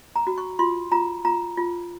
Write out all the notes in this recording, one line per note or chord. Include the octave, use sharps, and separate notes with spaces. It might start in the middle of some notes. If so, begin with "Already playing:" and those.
A#5
F#4
C#6
F4 C6
F4 A#5
F4 A#5
F4